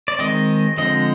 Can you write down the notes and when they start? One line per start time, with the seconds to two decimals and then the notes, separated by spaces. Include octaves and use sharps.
0.08 D5
0.19 D#3 G#3 C4 D#5
0.77 D3 F3 G#3 C4 D#5